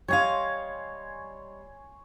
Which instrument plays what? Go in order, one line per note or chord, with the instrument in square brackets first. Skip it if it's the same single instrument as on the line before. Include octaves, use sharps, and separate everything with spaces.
[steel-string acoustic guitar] G3 D#5 F5 [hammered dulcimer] C#5 G#5 C6